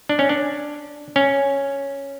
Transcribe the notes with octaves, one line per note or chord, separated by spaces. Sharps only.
D4
C#4
D4
C#4